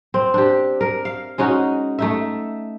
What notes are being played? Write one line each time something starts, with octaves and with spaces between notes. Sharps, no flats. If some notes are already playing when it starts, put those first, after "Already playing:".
C4
D4 G4
A#4
F5
G#3 C#4 D#4 F#4
A3 D#4 E5